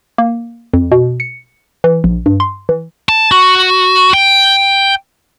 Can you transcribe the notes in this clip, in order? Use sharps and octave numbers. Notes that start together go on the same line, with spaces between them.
A#3
F2
B2
C#7
E3
A#1
G2
C6
E3
A5
F#4
G5